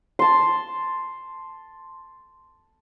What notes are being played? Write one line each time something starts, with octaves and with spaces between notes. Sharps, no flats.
A5 C6